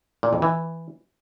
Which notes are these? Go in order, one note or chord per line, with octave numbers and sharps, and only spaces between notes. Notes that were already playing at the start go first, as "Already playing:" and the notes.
A#2
F2
E3